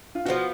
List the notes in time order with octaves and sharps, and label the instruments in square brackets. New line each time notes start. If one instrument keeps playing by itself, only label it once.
[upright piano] F4
[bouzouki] F3 G#3 B3 [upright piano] F#4